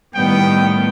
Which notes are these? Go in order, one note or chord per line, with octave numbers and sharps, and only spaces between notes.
A2 D#3 G3 B3 G5